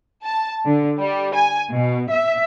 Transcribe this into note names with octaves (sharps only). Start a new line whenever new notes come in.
A5
D3
G3
G#5
B2
E5